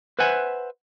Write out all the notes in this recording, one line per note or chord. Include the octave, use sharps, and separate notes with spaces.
B4 C5 E5 F#5 G#5